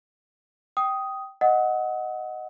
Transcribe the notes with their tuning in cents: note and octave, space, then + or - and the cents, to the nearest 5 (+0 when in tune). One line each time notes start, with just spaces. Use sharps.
G5 -15 D#6 +5
D#5 +0 F#5 +0 D#6 +35